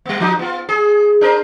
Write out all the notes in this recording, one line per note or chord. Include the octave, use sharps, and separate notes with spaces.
G3 B3
F3 D#4
B3 F4
G#4
D4 A#4 C5